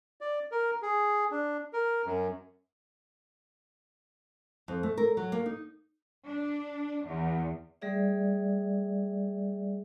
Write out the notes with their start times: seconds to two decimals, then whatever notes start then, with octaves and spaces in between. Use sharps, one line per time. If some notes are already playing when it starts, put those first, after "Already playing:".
0.21 D5
0.51 A#4
0.82 G#4
1.31 D4
1.73 A#4
2.06 F#2
4.68 F2
4.83 A3
4.97 A#4
5.17 F#3
5.32 A#3
5.46 D#4
6.26 D4
7.07 E2
7.82 G3 A3 G#4 D5 E5